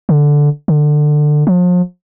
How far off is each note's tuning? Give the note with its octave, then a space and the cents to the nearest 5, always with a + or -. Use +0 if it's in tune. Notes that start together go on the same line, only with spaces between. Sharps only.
D3 -5
D3 +20
F3 +40